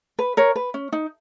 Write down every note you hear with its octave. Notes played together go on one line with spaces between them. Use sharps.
B4
A#4 C#5
B4
C#4
D#4